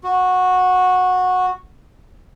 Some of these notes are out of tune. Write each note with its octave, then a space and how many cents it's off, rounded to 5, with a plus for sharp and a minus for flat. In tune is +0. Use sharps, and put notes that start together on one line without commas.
F#4 -15